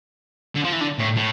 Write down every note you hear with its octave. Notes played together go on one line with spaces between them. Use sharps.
D3
F3
E3
D3
A2
A2